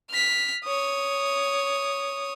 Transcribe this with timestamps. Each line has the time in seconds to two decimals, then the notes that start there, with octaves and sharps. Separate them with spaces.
0.11 F6 B6
0.64 C#5 D#6